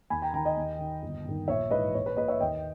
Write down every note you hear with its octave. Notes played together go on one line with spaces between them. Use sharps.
D#2 G#5 B5
G5 A#5
D#3 G5 A#5
D#5 G5
D#2
D#3
G1
G2 D#3
A#1 C#5 E5
G#2 E3 B4 D#5
A#1 C#5
B4
A#2 B4 D#5
C#5 E5
D#2 D#5 G5